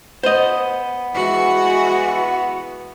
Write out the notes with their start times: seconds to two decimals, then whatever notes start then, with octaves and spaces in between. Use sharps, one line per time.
0.23 B3 C5 D#5
1.15 E3 G#3 F#4